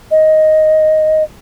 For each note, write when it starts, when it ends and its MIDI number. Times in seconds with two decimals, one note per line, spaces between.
0.11 1.23 75